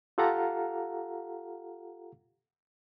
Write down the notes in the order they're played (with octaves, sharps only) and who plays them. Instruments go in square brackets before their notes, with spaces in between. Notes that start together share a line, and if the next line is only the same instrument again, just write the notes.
[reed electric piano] F4 G4 A4 F5 F#5 A#5